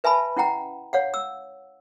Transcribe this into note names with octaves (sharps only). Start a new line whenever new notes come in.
B4 E5 G#5 A5 B5
C#4 E4 F#5 G5 A#5
C#5 F5 F#5
E6